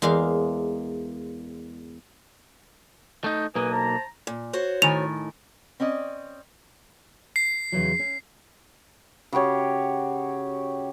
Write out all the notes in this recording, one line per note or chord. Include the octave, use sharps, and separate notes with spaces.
E2 G#3 A#3 F5
A3 D#4
B1 A#3 B4 G#5 D#6
C5 A5 A#5
A#2
F#4 C5 C#5
A2 D#3 G#5 F7
C4 C#4 D5 D#5
C7
E2 C#3 F#3
C#4
C#3 F#4 G4 C#5